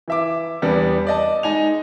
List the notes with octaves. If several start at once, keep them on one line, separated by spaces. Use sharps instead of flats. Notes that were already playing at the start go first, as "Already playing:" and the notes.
E3 E5 D6
E2 G3 B3 D4
D5 D#5 A5
G#3 D#4 G#5 F7